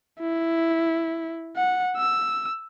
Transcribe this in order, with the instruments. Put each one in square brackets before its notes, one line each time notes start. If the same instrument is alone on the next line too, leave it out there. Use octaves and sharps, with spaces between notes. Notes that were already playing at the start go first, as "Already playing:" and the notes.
[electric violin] E4
F#5
E6